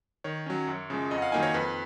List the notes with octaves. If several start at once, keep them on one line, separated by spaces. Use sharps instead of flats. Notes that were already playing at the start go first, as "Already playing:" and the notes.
D#3 C#5
F#3 C#4
F#2
C#3 F3 G#3
F2 D#5
F#5
F5
D#3 F#3 A#3 D#4 G#5
C#5
F2 B4